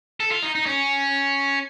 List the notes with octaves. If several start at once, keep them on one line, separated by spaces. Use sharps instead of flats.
A4
F4
D#4
D#4
C#4